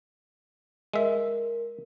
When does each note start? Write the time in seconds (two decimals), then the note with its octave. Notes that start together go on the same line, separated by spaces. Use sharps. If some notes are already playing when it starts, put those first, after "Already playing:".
0.94 G#3 A#4 E5